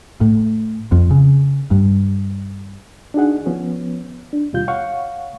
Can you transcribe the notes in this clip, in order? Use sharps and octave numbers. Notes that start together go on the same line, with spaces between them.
A2
F2
C#3
G2
D4 D#4 F#4 G#4 F#5
F3 B3 C#4
D4
D#2 B2 G3 F4 G6
C#5 F5 F#5 C#6